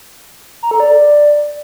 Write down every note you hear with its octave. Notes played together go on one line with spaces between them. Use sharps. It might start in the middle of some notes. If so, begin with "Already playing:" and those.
A#5
A4
D5